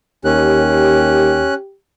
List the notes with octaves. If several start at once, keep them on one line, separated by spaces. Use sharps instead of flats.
D#2 C#4 G4 F#6